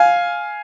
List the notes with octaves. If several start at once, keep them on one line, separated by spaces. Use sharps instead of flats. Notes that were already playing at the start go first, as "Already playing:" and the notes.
Already playing: F5 G#5